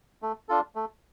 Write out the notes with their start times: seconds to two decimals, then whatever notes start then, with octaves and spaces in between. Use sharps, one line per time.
0.22 A3
0.49 D4 F4 A4
0.75 A3